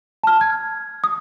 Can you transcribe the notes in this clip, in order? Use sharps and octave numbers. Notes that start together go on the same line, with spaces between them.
A5 F6
G#6
D#6